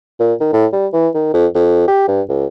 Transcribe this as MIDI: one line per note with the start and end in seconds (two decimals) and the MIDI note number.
0.20 0.34 46
0.40 0.50 51
0.53 0.66 45
0.73 0.87 55
0.93 1.09 52
1.14 1.33 51
1.34 1.47 41
1.55 1.86 41
1.88 2.04 67
2.08 2.22 43
2.29 2.46 37